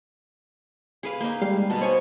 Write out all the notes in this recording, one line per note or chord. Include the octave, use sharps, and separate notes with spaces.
G#4 B4 F5
A#3 D#4
G3 G#3 F5
B2 B4 A5
B3 C5 C#5 G#5